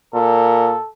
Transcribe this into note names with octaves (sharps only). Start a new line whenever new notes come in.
A#2 A4